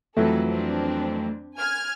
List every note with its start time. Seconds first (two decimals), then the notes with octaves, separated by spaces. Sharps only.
0.17 F2 E3 F#3 A3 A4 B4
0.49 C4 D4
1.57 G#5 F6 G#6